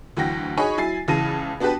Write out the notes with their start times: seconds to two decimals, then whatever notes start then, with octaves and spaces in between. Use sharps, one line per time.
0.17 D2 E3 F#3 F#4 G5 A#6
0.57 D#4 F#4 G#4 C#5 G#5 B5
0.77 F#3 E4 G#5 A6 C7
1.08 C#2 C#3 E3 A5 A#6 D#7
1.60 B3 D4 F#4 G4 B4 A5